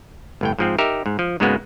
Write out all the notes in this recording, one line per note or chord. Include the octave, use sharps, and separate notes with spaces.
G1 A2 G5
G#2 F3 C4
D#4 G4 A#4 E5
G#2
F3
G#2 C#3 G#3 A#3 B3 F#4